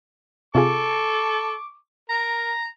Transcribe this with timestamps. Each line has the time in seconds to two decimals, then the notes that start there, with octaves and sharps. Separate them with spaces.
0.55 C3 F4 G#4 A4 C#6 D6
2.10 A#4 A#5